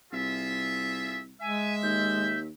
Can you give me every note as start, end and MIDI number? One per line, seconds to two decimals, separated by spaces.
0.13 1.39 36
0.13 1.20 65
0.13 1.20 68
0.13 1.20 76
1.41 2.36 56
1.41 2.43 76
1.41 1.76 80
1.83 2.49 39
1.83 2.39 91